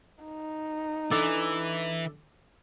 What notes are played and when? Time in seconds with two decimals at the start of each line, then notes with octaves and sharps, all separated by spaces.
0.24 D#4
1.12 E3 D4 A4 D5